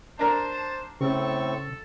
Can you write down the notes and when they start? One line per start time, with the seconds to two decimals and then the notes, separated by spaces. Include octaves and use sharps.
0.19 D4 A#4 C5 A5
1.01 A2 C#3 C4 A4 C#6